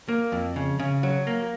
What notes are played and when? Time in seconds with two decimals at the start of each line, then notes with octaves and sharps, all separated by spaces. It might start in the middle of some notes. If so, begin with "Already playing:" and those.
0.09 A#3
0.32 F2
0.56 C#3
0.79 C#3
1.03 F#3
1.27 A#3